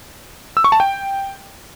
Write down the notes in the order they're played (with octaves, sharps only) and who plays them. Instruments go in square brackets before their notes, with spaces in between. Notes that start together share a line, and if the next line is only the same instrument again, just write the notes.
[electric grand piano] E6
C#6
A5
G5